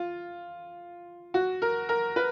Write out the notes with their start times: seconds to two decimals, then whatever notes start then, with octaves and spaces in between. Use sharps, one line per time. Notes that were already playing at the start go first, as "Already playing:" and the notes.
Already playing: F4
1.34 F#4
1.62 A#4
1.89 A#4
2.16 B4